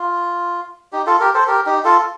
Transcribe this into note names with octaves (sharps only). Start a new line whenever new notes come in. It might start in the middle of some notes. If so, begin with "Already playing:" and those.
Already playing: F4
D#4 G4
F4 A4
G4 A#4
A4 C5
G4 A#4
D#4 G4
F4 A4